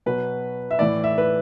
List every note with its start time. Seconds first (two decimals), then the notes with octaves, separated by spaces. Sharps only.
0.06 B2 F#3 B4
0.71 E5
0.79 A2 E3 D5
1.04 E5
1.18 B4